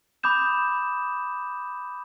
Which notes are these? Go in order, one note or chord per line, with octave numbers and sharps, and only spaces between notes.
B5 D6 D#6 G6 E7